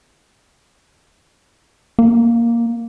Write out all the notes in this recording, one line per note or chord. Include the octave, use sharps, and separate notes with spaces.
A#3